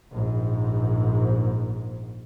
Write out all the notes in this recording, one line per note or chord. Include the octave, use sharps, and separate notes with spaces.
A#1 G#2